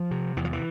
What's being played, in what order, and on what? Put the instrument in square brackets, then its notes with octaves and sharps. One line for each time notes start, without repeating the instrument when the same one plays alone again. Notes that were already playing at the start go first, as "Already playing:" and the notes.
Already playing: [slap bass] F3
C3
E2 E3
F3
E3